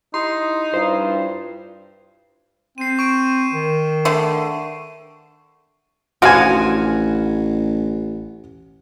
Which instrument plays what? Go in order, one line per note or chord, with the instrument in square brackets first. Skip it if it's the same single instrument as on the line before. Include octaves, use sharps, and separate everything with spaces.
[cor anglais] D#4 [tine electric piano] E4 G4 [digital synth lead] C6
[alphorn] G2 [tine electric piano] E4 F4 [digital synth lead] C5
[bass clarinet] C4 [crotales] C7 D#7
[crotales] C#6 D7 D#7
[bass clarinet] D#3
[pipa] D3 A3
[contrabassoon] A1 [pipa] D3 F3 F5 [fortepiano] F#4 G#5